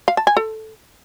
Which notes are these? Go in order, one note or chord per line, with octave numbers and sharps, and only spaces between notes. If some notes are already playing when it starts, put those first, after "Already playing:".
F5
A5
G#5
A4